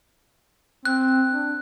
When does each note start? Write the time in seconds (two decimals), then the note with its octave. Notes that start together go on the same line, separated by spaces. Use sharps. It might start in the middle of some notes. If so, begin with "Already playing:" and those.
0.85 C4 F#6
1.31 D4